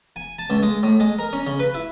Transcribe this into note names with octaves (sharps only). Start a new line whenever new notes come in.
G#5
A5
C#2
G#3
A2
G#3
A#4
C#4
C#3
B4
E4